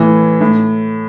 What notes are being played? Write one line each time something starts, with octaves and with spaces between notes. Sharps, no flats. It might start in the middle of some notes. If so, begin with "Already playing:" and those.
Already playing: A2 E3
A2